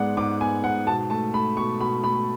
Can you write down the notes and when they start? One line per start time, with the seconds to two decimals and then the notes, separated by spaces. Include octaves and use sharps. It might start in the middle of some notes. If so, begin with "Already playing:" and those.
Already playing: G#2 G#3 B3 D5 F#5
0.17 G#2 D6
0.40 B3 G#5
0.64 G#2 F#5
0.87 B2 A5
1.10 A3 A5
1.33 A3 B5
1.57 B2 C#6
1.80 B2 B5
2.04 A3 B5